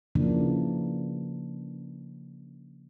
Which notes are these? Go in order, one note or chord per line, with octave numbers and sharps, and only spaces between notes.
C#3 E3 F3 A#3 D4